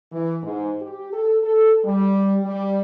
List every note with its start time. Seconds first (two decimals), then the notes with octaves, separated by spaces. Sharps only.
0.12 E3
0.43 G#2
0.81 G4
1.13 A4
1.44 A4
1.85 G3
2.45 G3